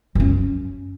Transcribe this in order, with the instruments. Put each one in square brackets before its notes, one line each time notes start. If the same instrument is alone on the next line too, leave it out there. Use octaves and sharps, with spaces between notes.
[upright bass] F#2 C#4